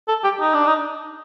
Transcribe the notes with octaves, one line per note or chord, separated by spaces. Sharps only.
A4
G4
D#4
D4
D#4